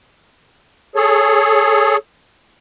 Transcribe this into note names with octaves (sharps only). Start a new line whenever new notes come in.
G#4 A4 C#5